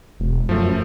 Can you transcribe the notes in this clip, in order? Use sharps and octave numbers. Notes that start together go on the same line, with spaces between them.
E1
F#2 F3 A3